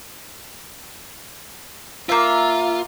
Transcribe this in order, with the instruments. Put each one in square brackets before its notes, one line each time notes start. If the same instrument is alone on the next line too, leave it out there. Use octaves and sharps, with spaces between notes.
[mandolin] A#3 E5 [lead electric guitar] F4